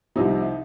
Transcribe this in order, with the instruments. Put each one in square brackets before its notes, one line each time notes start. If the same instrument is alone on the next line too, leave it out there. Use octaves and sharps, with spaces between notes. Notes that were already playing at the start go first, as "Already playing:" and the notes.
[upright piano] C2 C3 F3 D#4